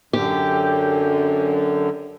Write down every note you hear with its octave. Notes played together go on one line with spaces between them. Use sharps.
F#2 D3 G4